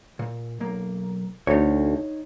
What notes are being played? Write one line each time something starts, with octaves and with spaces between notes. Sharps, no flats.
A#2
B1 A#3
D2 D#4 C#5